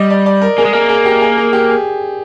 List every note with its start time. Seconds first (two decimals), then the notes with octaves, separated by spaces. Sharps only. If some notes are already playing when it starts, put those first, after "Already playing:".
Already playing: G3 D#5
0.10 D5
0.26 D5
0.42 A#4
0.58 A#3 G#4
0.65 G#3
0.73 A#3 G#4
0.89 G#4
1.05 G4
1.21 G#4
1.37 G#4
1.53 G4
1.69 G#4